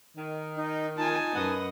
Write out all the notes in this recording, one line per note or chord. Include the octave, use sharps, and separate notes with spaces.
D#3
D#4
D#4 F4 G#5 A5
F#2 B4 D#5 F#5